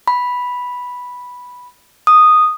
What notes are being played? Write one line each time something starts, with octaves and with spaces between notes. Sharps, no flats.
B5
D#6